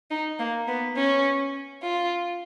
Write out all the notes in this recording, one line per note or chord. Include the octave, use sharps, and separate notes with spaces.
D#4
A#3
B3
C#4
F4